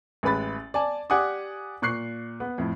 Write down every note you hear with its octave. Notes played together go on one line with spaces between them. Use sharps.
A1 G#3 B4 B5 A6
D5 G#5 A5
G4 D5 F#5 G#5 D6 D#6
A#2 C#6 F#6 C7
B3
F2 A2